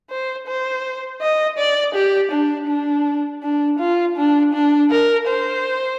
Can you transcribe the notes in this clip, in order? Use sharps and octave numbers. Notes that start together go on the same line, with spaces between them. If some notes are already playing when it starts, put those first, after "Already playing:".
C5
C5
D#5
D5
G4
D4
D4
D4
F4
D4
D4
A#4
C5